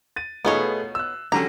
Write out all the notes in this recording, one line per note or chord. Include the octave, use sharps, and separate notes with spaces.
A6 D#7
B2 A3 B3 D#4 F4 G#4 B4 C#5
E6 F#6
D3 F#3 C#4 G4 A4 A#5